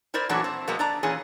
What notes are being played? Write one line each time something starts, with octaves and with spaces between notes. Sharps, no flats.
E4 A#4 C5 D5
A#2 E3 F#3 A3 D4 F#4
C4
C3 F#3 G#3 A#3 B3
D4 D5 A#5
A#2 E3 C#4 G#4